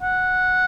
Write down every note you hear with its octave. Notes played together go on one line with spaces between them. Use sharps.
F#5